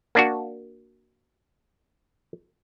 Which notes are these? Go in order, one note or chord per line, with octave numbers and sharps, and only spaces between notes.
A#3 D4 F#4